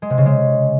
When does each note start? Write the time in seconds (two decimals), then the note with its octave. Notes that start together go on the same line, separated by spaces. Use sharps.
0.02 G#3
0.10 C3
0.18 C#3
0.26 G#3